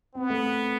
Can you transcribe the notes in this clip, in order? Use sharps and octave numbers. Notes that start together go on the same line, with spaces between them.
B3 C4
A3